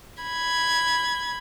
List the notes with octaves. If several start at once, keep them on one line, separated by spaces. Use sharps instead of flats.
B5 G#6